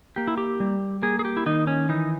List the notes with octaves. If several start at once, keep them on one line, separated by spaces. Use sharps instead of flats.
A#3 G4
E4
G4
G3
A#3 G#4
G#4
G4
E4
D#3 D#4
C#4
E3 D#4